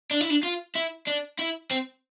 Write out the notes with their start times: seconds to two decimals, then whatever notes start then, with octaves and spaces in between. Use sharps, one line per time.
0.11 D4
0.21 E4
0.30 D4
0.43 F4
0.75 E4
1.07 D4
1.39 E4
1.71 C4